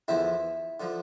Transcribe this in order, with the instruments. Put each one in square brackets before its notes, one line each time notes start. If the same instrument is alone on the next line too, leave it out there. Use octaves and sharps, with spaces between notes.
[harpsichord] E2 D3 F3 E4
D3 F3